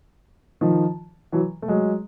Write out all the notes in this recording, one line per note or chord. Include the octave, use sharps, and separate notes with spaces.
D#3 F3
E3 F#3
A3
F#3 G#3